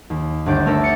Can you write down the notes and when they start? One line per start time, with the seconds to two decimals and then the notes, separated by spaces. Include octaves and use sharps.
0.10 D#2
0.46 G1 D2 D5 F#6 G6
0.66 A3 D4 A#4 D5 E5 F#5
0.81 A6 C#7